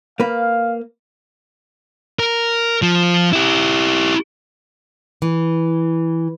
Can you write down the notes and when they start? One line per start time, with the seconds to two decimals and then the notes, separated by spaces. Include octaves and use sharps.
0.20 A#3 B4 F5
2.19 A#4
2.82 F3
3.33 E4 G4
5.22 E3